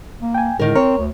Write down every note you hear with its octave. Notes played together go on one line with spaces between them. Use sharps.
A#3
G5 G#5
A2 D3 D#3 G#3 A#4
C4 A#4 C#5
D2